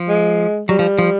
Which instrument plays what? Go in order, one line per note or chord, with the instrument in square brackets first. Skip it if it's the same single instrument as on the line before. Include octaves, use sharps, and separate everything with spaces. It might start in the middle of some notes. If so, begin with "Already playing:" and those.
Already playing: [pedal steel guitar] F3
[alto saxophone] G#3
[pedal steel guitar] F#3 [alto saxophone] G3
[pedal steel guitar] F3
F3